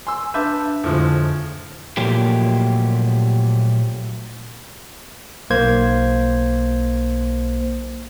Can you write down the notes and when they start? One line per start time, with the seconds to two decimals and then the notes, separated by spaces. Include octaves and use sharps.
0.07 G#5 C6 E6
0.34 D4 B4 E5 A5 D6 G6
0.84 F2 A2 D3 F3 G#3
1.97 A#2 F3 F#3 A3 A#3 G4
5.50 B1 A#3 C5 G#6